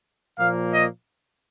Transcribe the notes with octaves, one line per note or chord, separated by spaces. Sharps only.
A#2 F3 A#3 F5
D#5